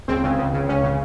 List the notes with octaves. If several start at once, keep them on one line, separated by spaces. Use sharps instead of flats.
C#2 C4
C#3
C#2
C#3
C#2 C#4
C#3